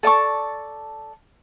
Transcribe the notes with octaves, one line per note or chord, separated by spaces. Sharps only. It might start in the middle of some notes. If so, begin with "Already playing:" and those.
A4 D5 A5 C#6